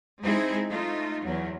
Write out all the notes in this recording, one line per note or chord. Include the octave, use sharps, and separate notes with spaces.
G#3 C4 D#4 E4 G#4
A3 D#4 F4
E2 F#3